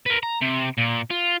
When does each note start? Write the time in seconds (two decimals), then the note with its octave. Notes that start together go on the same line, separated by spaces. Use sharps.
0.06 A#4 B4
0.23 A#5
0.42 C3
0.78 A#2
1.10 F4